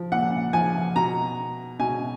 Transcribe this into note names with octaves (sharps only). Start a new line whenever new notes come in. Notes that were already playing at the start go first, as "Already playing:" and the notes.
Already playing: F3
A#2 F#5
F3 G#5
B2 A#5
B2 G#5